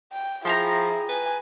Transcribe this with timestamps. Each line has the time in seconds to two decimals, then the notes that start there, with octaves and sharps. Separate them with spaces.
0.12 G5
0.45 F3 E4 G#4 G5 A5 A#5
1.09 B4 G#5